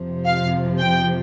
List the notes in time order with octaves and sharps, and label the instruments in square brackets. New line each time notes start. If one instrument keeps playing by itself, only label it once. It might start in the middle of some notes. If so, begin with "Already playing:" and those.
Already playing: [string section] F2 C3 F3
F5
G5